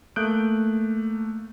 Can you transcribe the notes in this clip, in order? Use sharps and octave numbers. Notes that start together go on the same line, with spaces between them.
A3 A#3 D#6 F#6 G6 D7